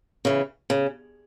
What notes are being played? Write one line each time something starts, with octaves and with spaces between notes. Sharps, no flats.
C#3 E3
C#3